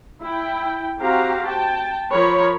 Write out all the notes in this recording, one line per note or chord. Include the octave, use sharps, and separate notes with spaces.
E4 G5
C4 F#4 G4 F5 A#5
G5 A5
F3 A#4 C#5 B5